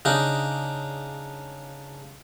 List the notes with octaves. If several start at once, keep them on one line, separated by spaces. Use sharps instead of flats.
C#3 D4 D#4